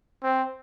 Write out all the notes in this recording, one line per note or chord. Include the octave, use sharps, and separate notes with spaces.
C4